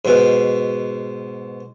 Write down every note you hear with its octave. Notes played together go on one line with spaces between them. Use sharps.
G#2 B2